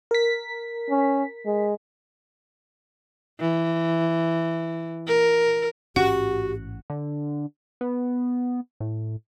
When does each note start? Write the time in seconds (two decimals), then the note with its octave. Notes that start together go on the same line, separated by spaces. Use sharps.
0.11 A#4 B6
0.90 C#4
1.46 G#3
3.40 E3
5.07 A#4
5.96 A1 G#2 C#4 F#4 G4 F#5
6.90 D3
7.81 B3
8.80 A2